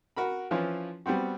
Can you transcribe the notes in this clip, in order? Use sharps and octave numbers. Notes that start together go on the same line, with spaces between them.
F#4 A#4 B5
E3 F3 C#4 E4 F4
G3 B3 C4 F#4